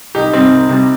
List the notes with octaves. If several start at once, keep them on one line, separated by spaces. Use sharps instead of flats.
C2 D#4 G4
C3 G3 C4 D#4
C2
C3 G3